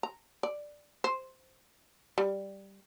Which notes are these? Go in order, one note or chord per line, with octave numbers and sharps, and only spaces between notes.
A#5
D5
C5
G3